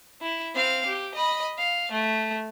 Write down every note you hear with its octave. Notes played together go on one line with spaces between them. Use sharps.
E4
C4 F5
G4
D#5 B5
F5
A3